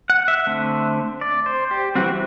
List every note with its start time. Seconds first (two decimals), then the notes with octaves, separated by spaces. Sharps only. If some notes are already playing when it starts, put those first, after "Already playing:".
0.10 F#5
0.28 E5
0.47 D3 A3 C4
1.21 D5
1.46 C5
1.71 G4
1.95 E3 G3 C4 F#4